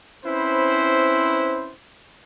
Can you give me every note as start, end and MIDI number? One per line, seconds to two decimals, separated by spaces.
0.25 1.73 60
0.25 1.73 61
0.25 1.73 64
0.25 1.73 71
0.25 1.73 72